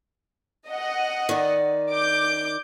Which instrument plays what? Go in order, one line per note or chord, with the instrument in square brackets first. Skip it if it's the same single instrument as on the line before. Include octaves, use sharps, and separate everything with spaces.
[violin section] D#5 F#5
[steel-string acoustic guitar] D#3 D5
[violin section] D6 G6